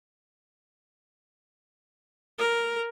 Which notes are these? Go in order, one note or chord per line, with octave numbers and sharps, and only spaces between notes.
A#4